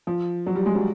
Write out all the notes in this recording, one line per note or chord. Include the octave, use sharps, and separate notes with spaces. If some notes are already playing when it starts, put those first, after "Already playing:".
F3
F#3
G3
G#3
F#3